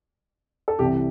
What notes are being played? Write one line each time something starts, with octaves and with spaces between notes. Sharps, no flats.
A4
C2 C3 E3 G4